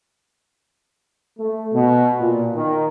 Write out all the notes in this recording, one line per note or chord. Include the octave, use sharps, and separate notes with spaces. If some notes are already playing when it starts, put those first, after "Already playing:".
A3
B2
A#2
D#3